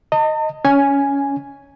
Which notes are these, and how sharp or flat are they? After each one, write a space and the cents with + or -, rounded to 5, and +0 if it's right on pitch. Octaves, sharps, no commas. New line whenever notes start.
D#5 +0 A5 +45
C#4 +15 G#5 +0